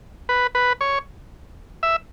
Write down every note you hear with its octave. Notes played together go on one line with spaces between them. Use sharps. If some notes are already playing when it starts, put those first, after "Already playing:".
B4
B4
C#5
E5